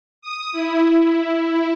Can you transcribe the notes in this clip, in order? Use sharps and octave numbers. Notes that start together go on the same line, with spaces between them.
D#6
E4
E4